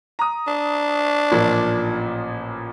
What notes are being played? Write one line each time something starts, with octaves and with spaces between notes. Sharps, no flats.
A#5 D#6
D4
A1 A#2 F3